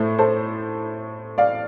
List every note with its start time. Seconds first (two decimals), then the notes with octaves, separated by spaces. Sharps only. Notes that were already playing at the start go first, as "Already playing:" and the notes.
Already playing: A2 A3 C5
0.18 A4 C5
1.38 D5 F5